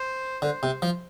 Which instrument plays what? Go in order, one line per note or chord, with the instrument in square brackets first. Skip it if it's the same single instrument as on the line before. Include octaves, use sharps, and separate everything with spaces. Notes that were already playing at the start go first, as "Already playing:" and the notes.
Already playing: [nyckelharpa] C5
[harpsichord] D3 [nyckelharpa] C5
[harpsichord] C3
F3